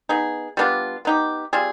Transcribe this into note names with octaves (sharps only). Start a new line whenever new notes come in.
B3 D#4 G#4
G3 B3 D4 F4
B3 D#4 G4
G3 C4 F4 G#4